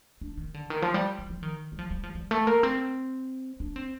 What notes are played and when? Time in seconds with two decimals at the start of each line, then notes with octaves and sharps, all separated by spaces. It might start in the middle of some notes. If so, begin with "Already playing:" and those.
0.21 D4
0.38 D#3
0.54 D3
0.70 D#3
0.82 F3
0.94 G3
1.19 F3
1.30 F3
1.43 D#3
1.72 G3
1.79 F3
1.91 G3
2.03 F3
2.15 G3
2.31 A3
2.47 A#3
2.63 C4
3.60 D4
3.76 C4